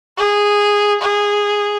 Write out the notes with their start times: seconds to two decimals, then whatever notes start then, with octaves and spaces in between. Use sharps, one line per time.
0.18 G#4
1.01 G#4